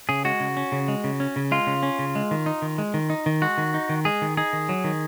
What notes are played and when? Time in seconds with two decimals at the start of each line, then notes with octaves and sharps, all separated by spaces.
0.09 C#3 G#4
0.25 G#3 F#4
0.40 C#3
0.57 C#4
0.72 C#3
0.88 G#3
1.04 C#3
1.20 C#4
1.36 C#3
1.51 G#3 F4
1.67 C#3
1.83 C#4
1.99 C#3
2.15 G#3
2.31 D#3
2.46 D#4
2.62 D#3
2.78 G#3
2.94 D#3
3.10 D#4
3.26 D#3
3.42 G#3 F#4
3.58 D#3
3.74 D#4
3.89 D#3
4.05 G#3 G#4
4.22 D#3
4.37 D#4 G#4
4.53 D#3
4.69 F#3
4.84 D#3